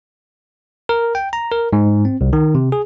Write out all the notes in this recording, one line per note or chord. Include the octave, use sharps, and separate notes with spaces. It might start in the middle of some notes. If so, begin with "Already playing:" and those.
A#4
G5
A#5
A#4
G#2
C4
C2
D#3
C3
G#4